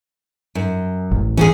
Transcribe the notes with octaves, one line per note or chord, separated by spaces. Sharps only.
F#2
A1
E3 C#4 F#4 G#4